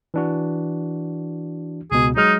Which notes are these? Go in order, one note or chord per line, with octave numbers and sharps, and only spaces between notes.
E3 D4 F#4
C#2 B2 G#4
F#3 G#3 D#4 F6